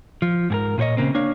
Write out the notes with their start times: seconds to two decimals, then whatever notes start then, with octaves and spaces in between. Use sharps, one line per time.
0.22 F3
0.50 G#2 G#4 A#4
0.78 A#2 F4 C5 C#5 D#5
0.97 C#3 A#3 C4
1.15 A#3 D4 C#5 F5